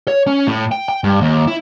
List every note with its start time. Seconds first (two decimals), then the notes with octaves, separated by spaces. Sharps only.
0.08 C#5
0.27 C#4
0.47 A2
0.72 G5
0.89 G5
1.04 G2
1.21 D#2
1.48 E4